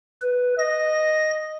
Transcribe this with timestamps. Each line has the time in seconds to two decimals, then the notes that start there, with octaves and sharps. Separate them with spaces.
0.22 B4
0.59 D#5 A#6